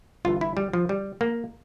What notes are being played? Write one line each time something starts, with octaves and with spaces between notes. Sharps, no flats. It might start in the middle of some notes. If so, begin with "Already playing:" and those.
G1 G2 E3 F4
E4
G3
F3
G3
A#3